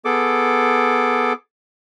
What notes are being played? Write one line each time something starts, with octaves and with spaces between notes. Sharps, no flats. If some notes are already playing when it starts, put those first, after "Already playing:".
B3 G#4 A4 D6